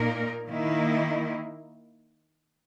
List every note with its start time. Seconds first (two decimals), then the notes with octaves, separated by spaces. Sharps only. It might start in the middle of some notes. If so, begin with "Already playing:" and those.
Already playing: A#2 A#3 D#4 A#4
0.47 D#3 A#3 E4